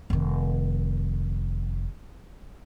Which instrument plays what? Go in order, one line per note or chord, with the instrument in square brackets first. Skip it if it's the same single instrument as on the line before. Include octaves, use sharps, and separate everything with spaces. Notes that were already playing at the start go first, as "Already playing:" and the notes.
[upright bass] F1 D#3